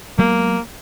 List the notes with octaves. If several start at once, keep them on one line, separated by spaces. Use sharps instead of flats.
F#3 G#3 A#3 B3